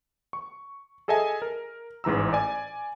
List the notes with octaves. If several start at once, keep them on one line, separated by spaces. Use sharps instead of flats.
C#6
G#4 A4 D#5 E5 G#5 A5
A#4
A1 G#2 E3 A#5 E6
D5 G#5